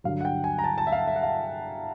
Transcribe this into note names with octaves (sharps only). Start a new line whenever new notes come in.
G2 D3 F#3 F5
F#5
G5
G#5
A#5
A5
A5
E5
F5
E5
F#5
F5